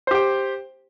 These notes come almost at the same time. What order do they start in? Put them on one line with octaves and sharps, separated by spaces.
C5 G4 G5